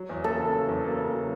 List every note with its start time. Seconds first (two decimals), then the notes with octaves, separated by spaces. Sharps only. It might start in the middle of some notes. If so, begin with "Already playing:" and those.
Already playing: F#3
0.09 E2
0.24 A#3 A4
0.39 C#3
0.53 F#3
0.69 E2
0.84 A#3
0.99 C#3
1.13 F#3